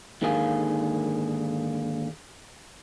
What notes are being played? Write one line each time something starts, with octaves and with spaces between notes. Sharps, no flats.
G#2 D3 D#3 A#3 G#4 F5